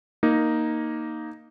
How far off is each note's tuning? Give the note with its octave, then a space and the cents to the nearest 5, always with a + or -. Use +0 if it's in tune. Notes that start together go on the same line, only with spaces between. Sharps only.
A#3 +0 D#4 +0